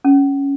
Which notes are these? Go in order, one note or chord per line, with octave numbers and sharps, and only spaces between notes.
C#4